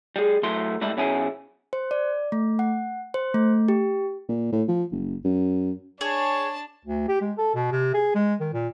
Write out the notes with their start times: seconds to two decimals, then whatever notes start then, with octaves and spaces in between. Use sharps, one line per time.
0.16 G3 G#4
0.43 F#3 A3 E4 C6
0.81 A2 G3 G#3 E4
0.97 B1 B2 C#4 E4 G#4 G#5
1.73 C5
1.91 D5
2.32 A3
2.59 F#5
3.14 C5
3.34 A3
3.68 G4
4.29 A#2
4.53 A2
4.68 F3
4.92 F#1
5.24 F#2
6.01 D4 G#4 C#5 A5
6.85 D2
7.08 G4
7.21 G#3
7.38 A4
7.55 B2
7.72 C3
7.94 G#4
8.15 G#3
8.40 D#3
8.53 A#2